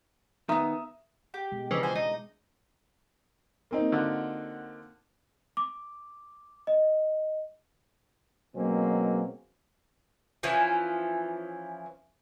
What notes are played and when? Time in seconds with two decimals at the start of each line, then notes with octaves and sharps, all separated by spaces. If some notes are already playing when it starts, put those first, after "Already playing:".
0.49 D#3 B3 E5 A#5 D#6
1.34 G4
1.52 B2 G#3
1.71 C#3 E3 F3 G#3 C#4 D4 D#5
1.83 C5 G#5
1.95 G#3 D#4 D#5
3.71 A#3 C4 D#4
3.92 D3 F4 F#4
5.57 D6
6.67 D#5
8.55 B2 F#3 G#3 A#3 C4 C#4
10.43 E3 F3 C#4